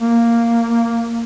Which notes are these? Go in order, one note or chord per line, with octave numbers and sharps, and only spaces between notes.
A#3